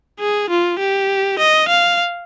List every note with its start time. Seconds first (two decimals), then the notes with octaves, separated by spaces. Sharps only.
0.20 G#4
0.50 F4
0.80 G4
1.39 D#5
1.69 F5